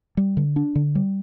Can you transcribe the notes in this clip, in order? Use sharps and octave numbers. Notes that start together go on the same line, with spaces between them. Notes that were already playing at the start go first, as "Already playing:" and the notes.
G3
D3
D4
D3
G3